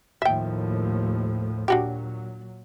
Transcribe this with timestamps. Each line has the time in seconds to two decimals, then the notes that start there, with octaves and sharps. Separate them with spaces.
0.22 D#2 A2 F3 E5 G5
1.68 A#2 F#3 D4 F#4 G4